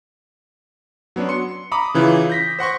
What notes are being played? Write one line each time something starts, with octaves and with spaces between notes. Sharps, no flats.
F#3 B3 C#4 D4
C6 C#7
A#5 B5 D6 D#6
C#3 E3 E4 F4
G6 A#6 B6
C5 F#5 C6 C#6